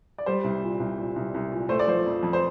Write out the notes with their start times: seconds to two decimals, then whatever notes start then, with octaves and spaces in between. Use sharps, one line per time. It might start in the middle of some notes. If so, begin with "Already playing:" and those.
0.18 D5
0.26 G3 C5
0.44 C2
0.63 A#2
0.80 C2
0.98 A#2
1.16 C2
1.34 C2
1.52 A#2
1.69 A3 C5
1.79 D5
1.87 F3 C5
2.06 F2
2.23 F2
2.33 C5